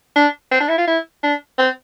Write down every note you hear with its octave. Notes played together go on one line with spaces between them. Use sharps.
D4
C4
D4
E4
F4
E4
D4
C4